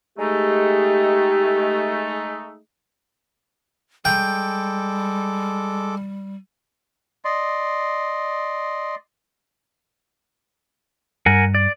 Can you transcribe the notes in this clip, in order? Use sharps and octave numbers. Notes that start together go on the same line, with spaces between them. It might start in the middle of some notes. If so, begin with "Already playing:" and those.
G#3 A3 D#4 G4
G3 G#3 A4 G5 D6
D5 D#5 C6
G2 A#4 F#5 G#5
D5